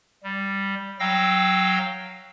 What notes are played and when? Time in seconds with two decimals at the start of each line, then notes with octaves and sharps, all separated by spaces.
0.23 G3
1.00 F#3 F5 G5 E6 A#6